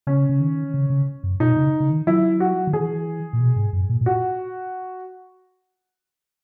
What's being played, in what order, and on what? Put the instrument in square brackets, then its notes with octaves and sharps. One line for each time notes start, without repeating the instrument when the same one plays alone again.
[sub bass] C#3 [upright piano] C#4
[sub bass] C#3
D#3
C#3
C#3
F#2
[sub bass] B2 [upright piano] D#4
[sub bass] C#3
C#3
D#3
[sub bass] F#3 [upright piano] E4
[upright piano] F#4
[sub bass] D#3
[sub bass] E3 [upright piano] G#4
[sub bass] A#2
B2
G#2
F#2
A#2
A#2
[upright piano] F#4